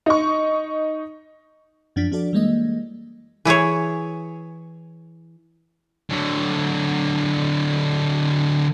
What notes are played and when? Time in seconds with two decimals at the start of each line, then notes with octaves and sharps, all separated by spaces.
0.06 D#4 C#6
1.96 F#2 F3 D4 A6 B6
2.12 F3 D4 F#4 A4 D5
2.33 E3 G3 G#3 A#3 D#5
3.45 E3 E4 G#4 C#5
6.10 D3 F#3